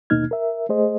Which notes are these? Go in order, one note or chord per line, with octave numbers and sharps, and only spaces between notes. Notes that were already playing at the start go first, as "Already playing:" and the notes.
D#2 B2 A#3 D#4 F6 G#6
A#4 E5
A3 G#4 C5 D#5